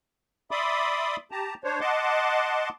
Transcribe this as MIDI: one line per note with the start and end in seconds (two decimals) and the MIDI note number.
0.51 1.16 74
0.51 1.16 76
0.51 1.16 83
0.51 1.16 84
0.51 1.16 86
0.51 1.16 87
1.31 1.54 67
1.31 1.54 81
1.31 1.54 82
1.64 1.80 62
1.64 1.80 72
1.64 1.80 73
1.81 2.69 75
1.81 2.69 78
1.81 2.69 81
1.81 2.69 84
1.81 2.69 86